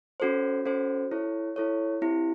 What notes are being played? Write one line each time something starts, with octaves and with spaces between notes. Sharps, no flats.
C#4 F#4 A4 C5
C#4 F#4 A4 C5
E4 A4 C#5
E4 A4 C#5
C4 E4 G4